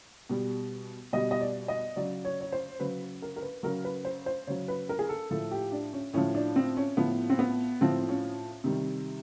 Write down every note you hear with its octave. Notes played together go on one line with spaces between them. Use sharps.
B2 G3
B2 G3 D#5
D#5
D5
D#5
C#3 F#3 D5
C#5
C#5
C5
C#3 F#3 B4
A#4
A#4
B4
C#3 F#3 A#4
B4
C5
C5
C#3 F#3 C#5
B4
A#4
G#4
A4
A2 F3 A4
G4
D4
C#4
A2 F3 C#4
D4
C4
C#4
A2 F3 B3
C4
B3
A2 F3 C4
C#4
C3 D#3 G3